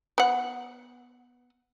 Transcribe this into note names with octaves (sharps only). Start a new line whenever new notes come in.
B3 F#5